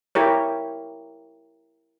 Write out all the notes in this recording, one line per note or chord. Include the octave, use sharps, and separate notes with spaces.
E4 G4 A#4 C#5